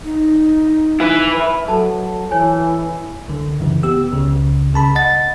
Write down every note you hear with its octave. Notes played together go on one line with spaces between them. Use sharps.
D#4
E4 B4
B4 E5 B5
F#3 A4 A5
E3 C#5 G#5
C2 D3
F#2 C#3 E3
B3 G4 E6
C#2 C#3
C2 C#3 A5 B5
D#5 F#5 A6